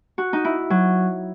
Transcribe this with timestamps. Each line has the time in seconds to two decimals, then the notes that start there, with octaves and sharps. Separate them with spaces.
0.18 F#4
0.33 D#4
0.44 E4
0.70 F#3